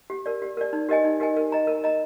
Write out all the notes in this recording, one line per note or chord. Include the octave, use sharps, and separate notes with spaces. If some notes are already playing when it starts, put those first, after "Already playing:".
G4
A#4 D5
G4
A#4 D5
D#4
G4 A#4 D#5 G#5
D#4
G4 A#4 D#5 G#5
A#4
D#5 A#5
A#4
D#5 A#5